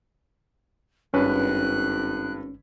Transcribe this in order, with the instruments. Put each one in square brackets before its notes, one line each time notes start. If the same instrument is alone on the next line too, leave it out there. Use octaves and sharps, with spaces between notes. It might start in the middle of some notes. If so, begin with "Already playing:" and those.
[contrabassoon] G#1 [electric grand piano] G2 B4 [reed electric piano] C#4 [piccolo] F#6